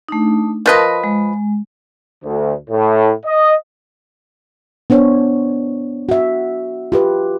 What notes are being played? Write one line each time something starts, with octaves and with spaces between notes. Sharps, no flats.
A3 D4 D#4
F3 A#4 B4 D#5 A5 C6
G#3
D2
A2
D#5
B3 D4 C5 C#5
F#4 E5
F4 G4 B4